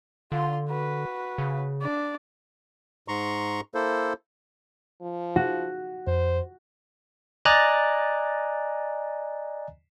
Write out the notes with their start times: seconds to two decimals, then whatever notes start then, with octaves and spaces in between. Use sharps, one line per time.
0.32 D3 F4 C6
0.69 F#4 B4
1.38 C#3
1.82 D4 D5
3.08 G#2 A#5 C6 C#6
3.74 A#3 E4 A4 C5
5.02 F3
5.36 F#4
6.07 F2 C5
7.45 D5 D#5 G#5 A#5 F#6 A6